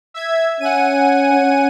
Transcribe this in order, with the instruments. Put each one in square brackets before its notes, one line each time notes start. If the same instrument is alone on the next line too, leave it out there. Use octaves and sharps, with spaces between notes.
[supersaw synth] E5 G#6
[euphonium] C#4 [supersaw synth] F#5 G#5 D#7
[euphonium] C#4